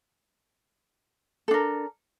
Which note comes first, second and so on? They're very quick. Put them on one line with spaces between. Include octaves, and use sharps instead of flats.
A4 D4 A#4